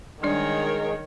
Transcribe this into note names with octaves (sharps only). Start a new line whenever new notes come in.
D#3 G3 G#3 D4 G#4 A#4 C#5 D5